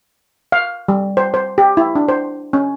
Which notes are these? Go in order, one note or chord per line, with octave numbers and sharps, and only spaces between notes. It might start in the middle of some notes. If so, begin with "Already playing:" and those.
F5
G3
C5
C5
G4
E4
D4
C5
C#4